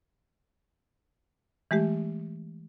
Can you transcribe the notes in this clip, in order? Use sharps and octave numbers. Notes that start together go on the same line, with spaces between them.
E3 G#3 A3 G4